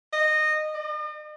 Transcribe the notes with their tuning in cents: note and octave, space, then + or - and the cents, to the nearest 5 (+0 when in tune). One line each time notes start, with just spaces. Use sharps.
D#5 -15
D#5 -45